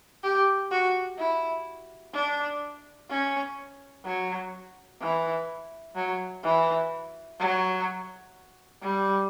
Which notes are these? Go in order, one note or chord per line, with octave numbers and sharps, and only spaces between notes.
G4
F#4
E4
D4
C#4
F#3
E3
F#3
E3
F#3
G3